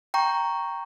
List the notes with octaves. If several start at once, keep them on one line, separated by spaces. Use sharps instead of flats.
G5 A#5 C#6